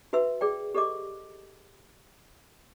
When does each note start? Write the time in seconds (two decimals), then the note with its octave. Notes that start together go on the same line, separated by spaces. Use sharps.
0.13 F#4 B4 E5 E6
0.41 G#4 D5 G5
0.75 G4 A4 D5 D#5 D6